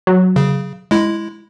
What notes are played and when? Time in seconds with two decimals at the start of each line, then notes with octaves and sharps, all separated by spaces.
0.07 F#3
0.36 C#3
0.91 G#3 E4